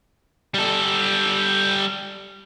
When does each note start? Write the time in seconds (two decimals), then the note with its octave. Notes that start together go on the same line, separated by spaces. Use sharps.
0.54 G3 A4